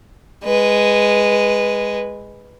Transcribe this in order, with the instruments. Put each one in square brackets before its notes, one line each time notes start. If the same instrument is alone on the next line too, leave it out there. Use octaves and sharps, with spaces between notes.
[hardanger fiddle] G#3 B4